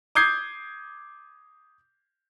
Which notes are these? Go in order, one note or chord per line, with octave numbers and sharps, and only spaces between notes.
D6 D#6 G6 G#6 C7